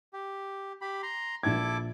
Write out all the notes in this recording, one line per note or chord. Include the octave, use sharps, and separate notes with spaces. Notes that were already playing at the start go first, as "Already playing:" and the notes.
G4
G4 B5
A#5 C6
A#1 E4 A4 D6 G#6